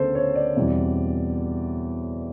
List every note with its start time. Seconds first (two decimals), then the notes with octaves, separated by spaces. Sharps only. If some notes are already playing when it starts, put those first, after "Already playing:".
Already playing: D2 C#3 B3 A4 C5
0.15 C#5
0.36 D5
0.56 E2 B2 G3 C4